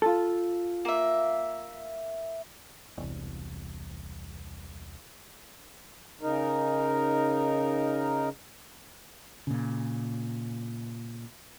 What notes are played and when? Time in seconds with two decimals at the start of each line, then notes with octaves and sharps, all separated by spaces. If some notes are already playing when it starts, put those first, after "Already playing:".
0.02 F4 A4
0.85 A#3 E5
2.97 E1 C2
6.21 C#3 D#4 A#4
9.47 A#2 C#3